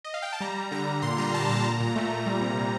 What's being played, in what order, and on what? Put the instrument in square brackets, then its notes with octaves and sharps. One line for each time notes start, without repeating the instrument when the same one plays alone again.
[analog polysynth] D#5
F5
G5
A5
G3 A#5
G3
D3 A#5
D3
A#2 C6
G3 A#5
G3 A5
A#2 A#5
A#2
A#2
A3
A#2
G3
C3
C3